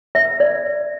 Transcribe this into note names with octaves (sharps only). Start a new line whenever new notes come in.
E5
D5